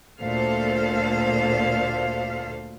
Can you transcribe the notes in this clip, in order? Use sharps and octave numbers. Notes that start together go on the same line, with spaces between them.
D2 A#2 A4 C5 F5